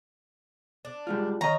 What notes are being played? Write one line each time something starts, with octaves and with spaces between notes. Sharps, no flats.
D4
G3 G#3 F4
D#3 C#5 D#5 A#5